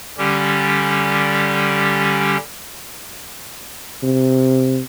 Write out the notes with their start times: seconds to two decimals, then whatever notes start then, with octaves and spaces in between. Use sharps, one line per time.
0.18 D3 G3 C#4 G4
4.03 C3